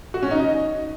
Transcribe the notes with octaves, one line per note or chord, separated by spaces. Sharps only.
F#4
C#4
D#4
D#5